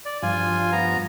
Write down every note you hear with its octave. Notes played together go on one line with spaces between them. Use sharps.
D5
G2 F3 F4 G#5
B3 A#5